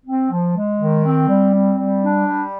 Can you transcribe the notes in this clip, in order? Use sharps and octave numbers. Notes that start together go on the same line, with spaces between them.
C4
F3
G#3
D#3
C4
G3
C4
G3
D4
G3